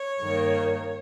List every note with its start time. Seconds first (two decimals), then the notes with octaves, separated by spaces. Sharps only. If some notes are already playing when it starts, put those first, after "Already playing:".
Already playing: C#5
0.19 G2 D#3 A#3